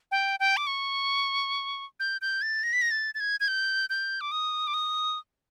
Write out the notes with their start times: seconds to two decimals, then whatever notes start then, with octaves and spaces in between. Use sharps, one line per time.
0.11 G5
0.40 G5
0.57 D6
0.67 C#6
2.00 G6
2.21 G6
2.42 A6
2.63 A#6
2.73 B6
2.82 A#6
2.91 A6
3.15 A6
3.20 G#6
3.40 G#6
3.48 G6
3.90 G6
4.21 D6
4.32 D#6
4.67 D6
4.74 D#6